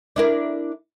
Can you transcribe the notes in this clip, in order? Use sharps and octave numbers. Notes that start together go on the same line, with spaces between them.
D4 E4 A#4